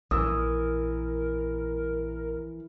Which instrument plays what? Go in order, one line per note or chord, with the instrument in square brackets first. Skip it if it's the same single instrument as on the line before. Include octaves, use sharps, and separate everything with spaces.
[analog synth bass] A#1 [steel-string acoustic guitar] E3 [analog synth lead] A#4 [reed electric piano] D#6 E6